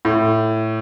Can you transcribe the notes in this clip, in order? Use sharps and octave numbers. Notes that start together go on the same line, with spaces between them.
A2